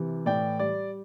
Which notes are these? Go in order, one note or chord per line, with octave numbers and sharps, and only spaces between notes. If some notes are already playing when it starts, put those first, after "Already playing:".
Already playing: C3 E3
A2 D5 G5
G3 D5